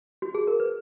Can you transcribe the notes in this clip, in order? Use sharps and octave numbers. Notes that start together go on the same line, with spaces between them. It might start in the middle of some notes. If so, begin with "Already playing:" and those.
F#4
G#4
A#4
B4